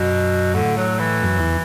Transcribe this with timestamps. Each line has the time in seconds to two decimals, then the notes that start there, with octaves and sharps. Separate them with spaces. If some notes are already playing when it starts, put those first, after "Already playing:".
Already playing: F#2 B2
0.54 A2 D3
0.77 F#3
0.99 E3
1.22 F#2
1.39 E2